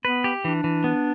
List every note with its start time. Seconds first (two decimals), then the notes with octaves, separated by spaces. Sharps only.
0.05 B3 B4
0.24 G4
0.45 E3 D4
0.64 E3
0.84 B3